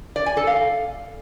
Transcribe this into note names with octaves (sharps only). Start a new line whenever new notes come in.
D5
G#5
A4
F5